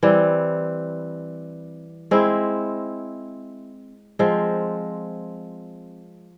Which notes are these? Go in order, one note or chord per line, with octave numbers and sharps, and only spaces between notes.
E3 G3 C4
G#3 C4 E4
F3 G#3 C4